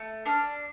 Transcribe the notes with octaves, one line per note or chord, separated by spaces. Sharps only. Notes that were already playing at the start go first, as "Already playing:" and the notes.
Already playing: A3
D4 F6